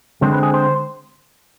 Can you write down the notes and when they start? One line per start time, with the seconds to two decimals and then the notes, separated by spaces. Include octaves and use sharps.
0.22 D3 G#3 C4 C5
0.33 B4
0.43 G#4
0.54 C5